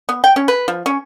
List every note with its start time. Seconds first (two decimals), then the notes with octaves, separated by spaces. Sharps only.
0.09 B3
0.24 G5
0.36 C#4
0.48 B4
0.68 F3
0.86 C#4